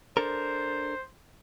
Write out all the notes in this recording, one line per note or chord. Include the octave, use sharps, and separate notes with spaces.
D4 A4 A#4 C5